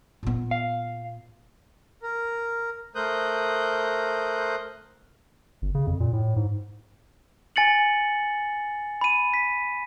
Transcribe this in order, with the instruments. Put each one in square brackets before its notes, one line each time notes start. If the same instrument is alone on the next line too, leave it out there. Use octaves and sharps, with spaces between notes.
[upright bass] A#2 B3
[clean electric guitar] F5
[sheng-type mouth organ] A#4
A3 A#4 C5 D#6 F#6 G6
[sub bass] G1
C#3
F2
A#2
A2
G#2
[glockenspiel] G#5 A6 C#7 F#7
B5 D#7
B6